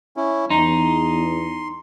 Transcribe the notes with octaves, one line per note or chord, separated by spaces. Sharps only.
C#4 E4
E2 D#4 C6